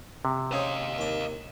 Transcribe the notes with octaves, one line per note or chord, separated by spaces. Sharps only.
C3
C#4 G#4 C5 D#5 F5
D#2 D6